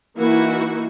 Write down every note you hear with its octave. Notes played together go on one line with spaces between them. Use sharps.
E3 A#3 D#4 E4 F#4